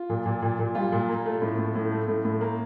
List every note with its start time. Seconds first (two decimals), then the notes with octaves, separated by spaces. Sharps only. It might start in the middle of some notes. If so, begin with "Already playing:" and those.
Already playing: F4
0.10 A#2
0.25 A#2
0.42 A#2
0.59 A#2
0.75 G3 F4
0.92 A#2
1.09 A#3
1.26 A3
1.42 A2
1.58 A2
1.75 A2
1.91 A3
2.08 A2
2.25 A2
2.41 A#3